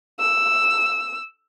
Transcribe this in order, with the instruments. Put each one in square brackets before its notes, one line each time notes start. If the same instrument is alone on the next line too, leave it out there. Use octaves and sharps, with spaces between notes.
[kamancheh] E6